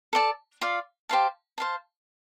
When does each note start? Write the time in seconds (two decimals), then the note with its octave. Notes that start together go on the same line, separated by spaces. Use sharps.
0.13 A4 D5 A5
0.61 F4 D5 F5
1.09 G4 C5 F5 A5
1.58 C5 F5 A5